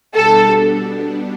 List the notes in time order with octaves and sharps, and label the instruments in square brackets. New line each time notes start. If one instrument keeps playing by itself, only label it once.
[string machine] B2 G3 B3 D4 [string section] A4